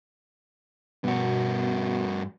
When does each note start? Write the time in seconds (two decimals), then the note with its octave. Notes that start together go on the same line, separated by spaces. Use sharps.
1.04 G2 B2 F#4